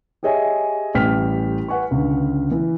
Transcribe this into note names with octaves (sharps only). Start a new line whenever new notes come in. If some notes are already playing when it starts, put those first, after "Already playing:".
G4 G#4 C#5 D#5 E5 G#5
A1 G3 A3 G4 F6 B6
B4 F#5 G#5 C#6
C#2 D3
E3